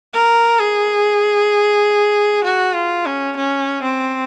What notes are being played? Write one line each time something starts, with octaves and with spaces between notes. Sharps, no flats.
A#4
G#4
F#4
F4
C#4
C#4
C4